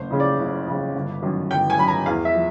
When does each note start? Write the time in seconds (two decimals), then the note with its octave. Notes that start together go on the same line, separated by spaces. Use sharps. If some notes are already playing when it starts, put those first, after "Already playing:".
Already playing: F#1 C5
0.10 F2 C#3
0.20 D5
0.39 F#1
0.66 F2 C#3
0.95 G1
1.22 F#2 D#3
1.51 G1 G5
1.70 G#5
1.78 F#2 D#3 B5
1.88 A#5
2.06 E2 F5
2.25 E5
2.35 F3